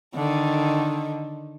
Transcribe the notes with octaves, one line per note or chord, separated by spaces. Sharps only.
D3 D#3